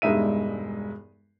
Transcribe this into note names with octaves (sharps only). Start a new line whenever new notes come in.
E1 G2 G#3 D#4 E5 D#7